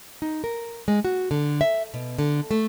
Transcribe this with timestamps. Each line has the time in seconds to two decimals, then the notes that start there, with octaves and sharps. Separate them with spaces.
0.22 D#4
0.44 A#4
0.88 G#3
1.05 F#4
1.31 D3
1.61 E5
1.94 B2
2.18 D3
2.51 A3